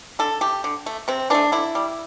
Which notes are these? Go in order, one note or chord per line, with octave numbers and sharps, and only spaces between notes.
D3 A4
A3 G4
D3
A3
C3 C4
E3 A3 D4
D3 E4
G3